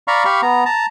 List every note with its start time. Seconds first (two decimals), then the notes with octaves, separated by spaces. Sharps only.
0.08 D5 F5 A#5 B5 C#6
0.25 G4 F5 B5 C#6
0.43 B3 A#5
0.66 A5 A#5